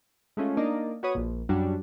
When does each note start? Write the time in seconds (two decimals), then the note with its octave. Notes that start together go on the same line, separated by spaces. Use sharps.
0.37 G#3 A3 C#4 F4
0.57 A#3 D4 D#4 D5 D#5
1.03 F#4 B4 C#5 D#6
1.15 A#1 A#2
1.49 F#2 F#3 G3 D4 F#4